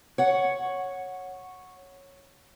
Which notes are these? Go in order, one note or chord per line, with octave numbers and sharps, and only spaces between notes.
C#5 F#5